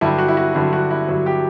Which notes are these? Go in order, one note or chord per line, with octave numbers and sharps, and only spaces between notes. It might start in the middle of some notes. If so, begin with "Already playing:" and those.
G2 D3 F#3 E4
F#4
E4
F#4
G2 D3 F#3 E4
F#4
E4
G2 D3 F#3
G4